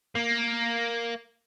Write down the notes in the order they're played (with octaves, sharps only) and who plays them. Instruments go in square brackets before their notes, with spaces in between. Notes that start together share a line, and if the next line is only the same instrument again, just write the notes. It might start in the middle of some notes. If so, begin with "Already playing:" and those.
[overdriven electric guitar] A#3